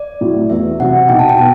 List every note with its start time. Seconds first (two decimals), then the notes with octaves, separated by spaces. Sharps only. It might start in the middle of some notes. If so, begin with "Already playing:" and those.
Already playing: D5
0.21 A2 F#3
0.50 E2 E5
0.80 C3 F#3 F#5
1.09 B1 G5
1.19 A5
1.29 G5
1.38 B2 A5